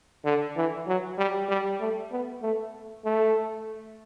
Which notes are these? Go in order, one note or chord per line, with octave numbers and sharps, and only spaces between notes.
D3
E3
F#3
G3
G3
A3
B3
A3
A3